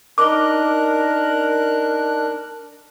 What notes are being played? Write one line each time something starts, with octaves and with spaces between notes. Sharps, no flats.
D4 D#4 A#4 D#5 D6 F#6